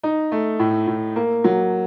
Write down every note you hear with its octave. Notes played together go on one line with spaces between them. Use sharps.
D#4
A3
A2
A2
A#3
F#3